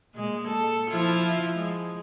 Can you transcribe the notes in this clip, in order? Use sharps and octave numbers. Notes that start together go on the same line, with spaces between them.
A#2 G#3
A4
F3 E4 F4
G#3